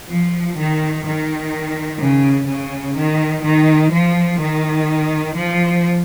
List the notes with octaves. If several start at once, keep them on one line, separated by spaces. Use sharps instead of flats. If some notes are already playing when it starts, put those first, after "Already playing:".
F3
D#3
D#3
C#3
C#3
D#3
D#3
F3
D#3
F3